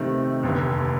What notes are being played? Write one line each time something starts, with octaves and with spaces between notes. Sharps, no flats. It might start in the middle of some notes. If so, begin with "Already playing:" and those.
Already playing: C3 D#3 A3 C4
F1 D#2 D3